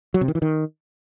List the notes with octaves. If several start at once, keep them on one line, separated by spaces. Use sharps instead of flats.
F#3
C3
D#3
E3
D#3